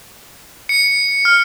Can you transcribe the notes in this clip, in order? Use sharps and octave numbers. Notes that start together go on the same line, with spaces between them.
C#7
F6